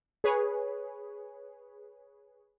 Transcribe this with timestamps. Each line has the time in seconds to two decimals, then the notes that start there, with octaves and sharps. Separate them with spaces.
0.24 G#4 B4 C#5